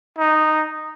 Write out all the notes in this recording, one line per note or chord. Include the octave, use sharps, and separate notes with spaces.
D#4